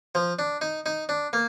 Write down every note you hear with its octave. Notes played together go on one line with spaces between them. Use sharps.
F3
D4
D#4
D#4
D4
A#3